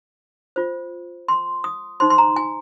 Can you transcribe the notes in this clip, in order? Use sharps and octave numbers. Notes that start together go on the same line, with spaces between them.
F4 C5
C6
D#6
D#4 C5 C6
C6
A#5
G#5